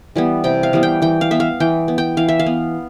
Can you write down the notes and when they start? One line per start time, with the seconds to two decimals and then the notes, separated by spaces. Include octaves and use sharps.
0.16 E3 G3 B3
0.44 C3 G5
0.63 F5
0.73 E3 G3 B3
0.83 G5
1.02 E3 G5
1.21 F5
1.31 B3 E5
1.40 F5
1.60 E3 G5
1.88 B3
1.98 G5
2.17 E3 F5
2.29 E5
2.39 F5
2.46 B3